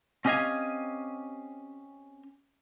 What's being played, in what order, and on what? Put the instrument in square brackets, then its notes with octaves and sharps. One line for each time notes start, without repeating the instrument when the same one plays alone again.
[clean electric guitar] C4 C#4 G4 D#5 F5 G#5